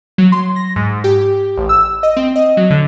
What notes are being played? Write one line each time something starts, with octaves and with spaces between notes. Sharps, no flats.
F#3
C6
A#6
G#2
G4
A1
E6
D#5
C4
D#5
F#3
D3